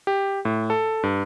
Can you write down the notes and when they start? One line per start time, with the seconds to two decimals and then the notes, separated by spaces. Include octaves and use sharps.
0.07 G4
0.45 A2
0.70 A4
1.03 G2